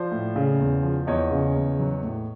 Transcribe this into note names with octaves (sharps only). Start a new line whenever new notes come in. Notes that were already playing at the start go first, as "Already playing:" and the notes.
Already playing: F3 C5 D5
A2
C#3
E2
F3
E2 C#5 D#5
C#3
E2
F#3
A2